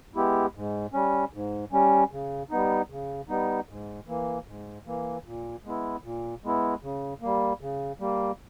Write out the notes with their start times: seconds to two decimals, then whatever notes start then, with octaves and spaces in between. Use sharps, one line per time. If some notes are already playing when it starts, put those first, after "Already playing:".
0.16 G#3 B3 E4 G4
0.55 G#2
0.93 G3 C#4
1.34 G#2
1.73 G3 C#4
2.11 C#3
2.51 G3 B3 D#4
2.90 C#3
3.29 G3 B3 D#4
3.69 G#2
4.08 E3 A#3
4.47 G#2
4.86 E3 A#3
5.25 A#2
5.65 G#3 B3 E4
6.03 A#2
6.44 G#3 B3 E4
6.83 C#3
7.22 G3 A#3
7.61 C#3
8.00 G3 A#3